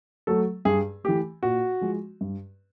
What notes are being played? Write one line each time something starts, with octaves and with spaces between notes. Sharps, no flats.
F#3 A3 A4
G2 G#4
E3 A3 G4
A#2 F#4
F3 G#3
G2